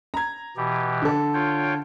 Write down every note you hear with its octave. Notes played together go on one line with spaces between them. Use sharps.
A#5 G#6
B2 E3 G4
D3 A4
F4 C#5 G5